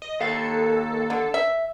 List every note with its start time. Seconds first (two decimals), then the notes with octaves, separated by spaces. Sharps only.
0.02 D#5
0.20 D#2 A4 F5
1.10 D3
1.34 E5